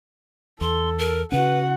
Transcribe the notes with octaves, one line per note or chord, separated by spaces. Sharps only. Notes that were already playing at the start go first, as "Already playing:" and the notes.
E2 A4 C6
A#4
C#3 C#4 F#4 B4 F#5